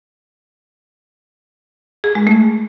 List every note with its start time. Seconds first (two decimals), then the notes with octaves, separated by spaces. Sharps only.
2.04 G#4
2.15 G#3
2.27 A3